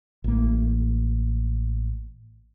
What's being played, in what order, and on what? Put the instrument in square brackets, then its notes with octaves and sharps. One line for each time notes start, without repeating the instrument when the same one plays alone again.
[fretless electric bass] A1 A#3